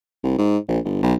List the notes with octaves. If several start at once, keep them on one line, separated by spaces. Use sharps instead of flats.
C2
G#2
A#1
G1
B1